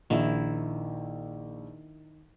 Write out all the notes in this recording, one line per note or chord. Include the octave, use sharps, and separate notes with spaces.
A#1 D#3 E4